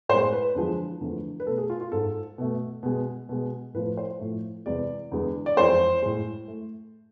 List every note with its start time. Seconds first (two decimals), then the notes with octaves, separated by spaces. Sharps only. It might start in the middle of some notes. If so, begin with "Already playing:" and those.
0.09 A2 C5
0.13 G#3
0.33 B4
0.55 E2 D3 F3 G#3
1.01 E2 D3 F3 A3
1.40 B4
1.46 B2 A3 A4
1.58 G#4
1.70 F4
1.81 F4
1.92 G#2 G#3 A4
2.38 B2 A3
2.83 B2 G#3
3.29 B2 G#3
3.74 A2 F3 A3 B4
3.97 C5
4.19 A2 F3 A3
4.66 E2 C3 G#3 D5
5.12 E2 D3 G#3
5.46 D5
5.57 F2 E3 G#3 C5
6.02 A2 G#3
6.48 A3